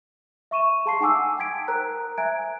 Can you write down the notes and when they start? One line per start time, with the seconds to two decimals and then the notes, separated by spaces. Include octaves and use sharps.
0.51 E5 C#6 D#7 E7
0.86 G#4 F5 A5 C6 C#6 C7
1.00 D#4 F#5 G#5 D6 E6
1.38 G5 A5 D#6 G#6 B6 D7
1.68 A#4 C5 A#5 F#6
2.18 E5 G#5 A#5 F#6 G#6 D7